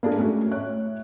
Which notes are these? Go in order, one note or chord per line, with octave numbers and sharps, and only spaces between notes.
A#3 D4 F4 G#4
A2 G#3 A3 C#4 F#4
A2 C#5 F#6